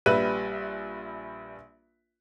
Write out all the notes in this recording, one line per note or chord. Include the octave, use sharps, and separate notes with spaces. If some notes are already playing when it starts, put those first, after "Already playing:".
A#1 G3 B4 E5 F#6 D#7